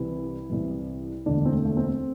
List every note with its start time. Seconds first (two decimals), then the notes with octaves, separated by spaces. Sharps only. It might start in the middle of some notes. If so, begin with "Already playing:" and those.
Already playing: C2 C3 E3 E4
0.50 C2 C3 E3
1.26 E1 D2 D3 D4
1.45 C4
1.52 A3
1.65 A3
1.77 C4